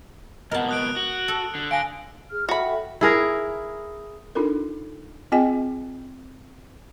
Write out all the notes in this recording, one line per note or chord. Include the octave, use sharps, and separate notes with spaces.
C#2 B2 A#4 D#5 F#5 A5
D#6 F#6 D7
F#4
A4
D3
F5 G#5 A#6 D7
G#4 F6
F#4 A4 E5 G5 B5
E4 G#4 A#4
D4 D#4 F4 A4 A#4
C4 F4 G#4 D#5 G5 G#5